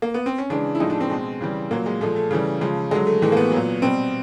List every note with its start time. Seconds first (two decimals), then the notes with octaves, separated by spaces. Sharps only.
0.02 A#3
0.14 B3
0.26 C4
0.38 C#4
0.50 C#3 E3 G#3 D4
0.75 E4
0.80 A2 F3 G#3 D#4
0.90 D4
1.00 C4
1.10 B2 G#3
1.41 C#3 E3 G3
1.71 A#2 F#3 A#3
1.86 G#3
2.01 A#2 F3 G#3 A3
2.16 A3
2.31 C#3 E3 G3
2.61 C#3 F3 G#3
2.91 D3 F#3 G#3
3.07 A3
3.22 A2 E3 G#3 A3
3.32 A#3
3.37 B3
3.52 A#2 F#3
3.82 B2 G3 C4